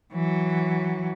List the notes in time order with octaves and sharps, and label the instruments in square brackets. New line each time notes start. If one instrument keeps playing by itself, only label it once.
[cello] E3 F#3